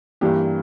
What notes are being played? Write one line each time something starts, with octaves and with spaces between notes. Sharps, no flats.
G2 E3 A#3 D4 G4